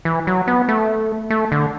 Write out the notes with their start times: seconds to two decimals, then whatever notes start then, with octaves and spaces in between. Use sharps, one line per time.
0.05 E3
0.27 F#3
0.47 B3
0.68 A3
1.30 A3
1.52 D3